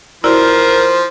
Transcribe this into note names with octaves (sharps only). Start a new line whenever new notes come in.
F3 E4 F#4 A#4 C5 D5